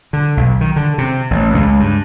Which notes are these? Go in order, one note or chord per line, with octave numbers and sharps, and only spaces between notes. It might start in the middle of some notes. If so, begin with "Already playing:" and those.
D3
B1
D#3
D3
C3
A1
C#2
G2